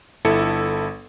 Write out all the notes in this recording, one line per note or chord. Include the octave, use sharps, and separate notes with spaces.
G1 E4 A4 C#7